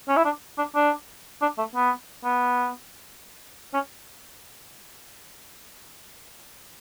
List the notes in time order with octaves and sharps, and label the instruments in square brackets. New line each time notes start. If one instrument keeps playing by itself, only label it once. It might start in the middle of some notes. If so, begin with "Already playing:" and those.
[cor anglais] C#4
E4
D4
D4
D4
D4
A3
B3
B3
C#4